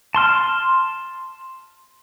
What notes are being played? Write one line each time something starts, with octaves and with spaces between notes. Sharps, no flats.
A5 C6 F6